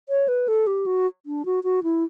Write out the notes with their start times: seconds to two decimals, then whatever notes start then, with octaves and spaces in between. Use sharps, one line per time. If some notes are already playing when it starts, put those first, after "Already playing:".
0.09 C#5
0.28 B4
0.48 A4
0.67 G4
0.86 F#4
1.26 D4
1.45 F#4
1.64 F#4
1.83 E4